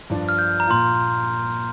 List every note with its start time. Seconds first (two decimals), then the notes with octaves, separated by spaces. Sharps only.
0.10 G2 F3 D4
0.29 F6
0.39 G6
0.60 A#5
0.67 A#2 A#3 F4 C6